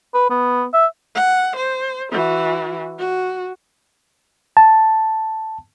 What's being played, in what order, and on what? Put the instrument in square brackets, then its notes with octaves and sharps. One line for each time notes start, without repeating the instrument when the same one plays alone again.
[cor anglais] B4
B3
E5
[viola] F#5
C5
E3 F#4
F#4
[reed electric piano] A5